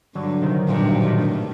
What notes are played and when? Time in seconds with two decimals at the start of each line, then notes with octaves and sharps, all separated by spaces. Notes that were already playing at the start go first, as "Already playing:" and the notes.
0.15 G2 D3 F#3
0.41 C3 D#3
0.68 G2 A#2 D3
0.81 A2 C3
0.94 A#2 D3
1.07 C3 D#3
1.20 A2